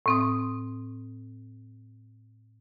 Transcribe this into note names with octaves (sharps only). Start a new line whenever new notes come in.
A2 C4 D#6